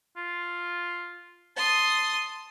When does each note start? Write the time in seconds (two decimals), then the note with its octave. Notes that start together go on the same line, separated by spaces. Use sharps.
0.17 F4
1.57 A5 C6 D#6